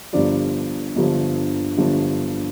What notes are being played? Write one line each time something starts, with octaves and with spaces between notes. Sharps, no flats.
G1 G2 D3 F3 D5
G1 G2 D3 F3
G1 G2 D3 F3